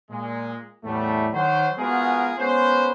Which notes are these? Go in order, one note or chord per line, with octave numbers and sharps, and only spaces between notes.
A#2 G#3
E2 A2 G3 A3
D#3 F#3 C5
G#3 B3 F4 F#4 G#4 A#4
G#3 B3 C#4 B4 C5